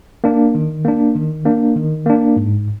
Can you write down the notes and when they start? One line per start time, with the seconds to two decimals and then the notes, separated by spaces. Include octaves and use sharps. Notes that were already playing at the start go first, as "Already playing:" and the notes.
0.24 A#3 D4
0.54 D#3
0.85 A#3 D4
1.15 D#3
1.45 A#3 D4
1.76 D#3
2.06 A#3 D4
2.36 G#2